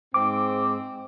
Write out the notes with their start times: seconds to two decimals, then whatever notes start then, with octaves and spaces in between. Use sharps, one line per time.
0.14 G#2 C4 D6